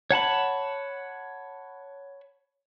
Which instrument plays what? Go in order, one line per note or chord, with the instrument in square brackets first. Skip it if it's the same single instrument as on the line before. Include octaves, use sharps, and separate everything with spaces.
[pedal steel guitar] C#5 F#5 A5 B5